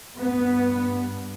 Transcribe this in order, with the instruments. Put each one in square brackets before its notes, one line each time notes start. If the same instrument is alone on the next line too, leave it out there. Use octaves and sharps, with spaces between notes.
[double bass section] G2 B3